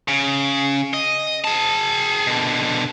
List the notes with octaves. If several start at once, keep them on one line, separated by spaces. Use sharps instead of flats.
C#3
D#5
G#4 A5
B2 D3